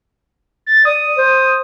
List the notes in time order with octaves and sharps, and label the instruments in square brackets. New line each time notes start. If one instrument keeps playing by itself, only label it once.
[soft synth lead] A6
[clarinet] D5 [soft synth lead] D#6
[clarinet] C5